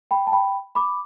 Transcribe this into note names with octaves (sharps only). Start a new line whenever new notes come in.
G5 B5
A5
G5 B5
B5 D6